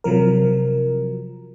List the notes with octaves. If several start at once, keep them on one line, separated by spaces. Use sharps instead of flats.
C3 F3 F#3 A#4